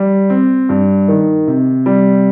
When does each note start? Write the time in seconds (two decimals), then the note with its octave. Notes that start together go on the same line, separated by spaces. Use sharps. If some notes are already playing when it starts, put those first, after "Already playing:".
Already playing: G3
0.30 C4
0.69 G2
1.08 D#3
1.47 C3
1.86 G3